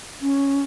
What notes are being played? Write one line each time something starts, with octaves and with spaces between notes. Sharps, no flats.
C#4